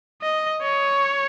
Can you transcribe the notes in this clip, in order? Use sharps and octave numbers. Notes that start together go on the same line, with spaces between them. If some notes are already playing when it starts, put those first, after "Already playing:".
D#5
C#5